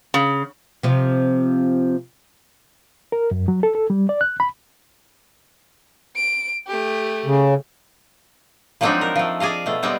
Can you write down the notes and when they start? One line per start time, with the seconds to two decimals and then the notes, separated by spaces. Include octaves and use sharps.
0.14 C#3
0.83 C3 F3
3.12 A#4
3.31 F#2
3.48 F#3
3.63 A4
3.75 A4
3.90 G3
4.09 D5
4.21 F#6
4.40 B5
6.16 D7
6.67 A3 G4
7.25 C#3
8.81 F3 F#3 G#3 C4 D4 D#4
9.01 A#4
9.16 F3 A3
9.40 G#4 D5 D#5 F5
9.66 B2 A3
9.83 G3 G#3 B3 C4